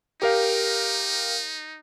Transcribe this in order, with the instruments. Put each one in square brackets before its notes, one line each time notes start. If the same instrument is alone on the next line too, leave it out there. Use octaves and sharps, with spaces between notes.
[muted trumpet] D#4 [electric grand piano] G4 A#4 F5